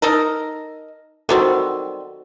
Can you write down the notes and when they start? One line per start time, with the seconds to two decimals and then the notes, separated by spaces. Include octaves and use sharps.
0.02 D#4 A4 A#4
1.29 D#3 G3 C4 F#4 A4